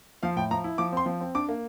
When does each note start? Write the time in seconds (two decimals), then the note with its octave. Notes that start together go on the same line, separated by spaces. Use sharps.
0.23 F3 F5
0.36 A2 G5
0.51 F3 A#5
0.64 E4
0.78 F3 D6
0.92 C4 C6
1.06 F3
1.21 C4
1.35 D4 D6
1.49 A#3